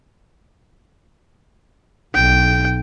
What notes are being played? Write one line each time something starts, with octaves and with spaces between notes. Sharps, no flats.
B1 G5